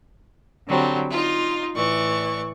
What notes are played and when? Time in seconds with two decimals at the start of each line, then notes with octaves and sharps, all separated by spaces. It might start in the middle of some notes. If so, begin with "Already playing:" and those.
0.68 D3 F#3 G3 C4
1.10 D#4 F4
1.75 A2 E3 D5 C#6